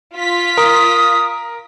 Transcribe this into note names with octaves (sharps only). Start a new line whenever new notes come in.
F4 B6
A#4 D#6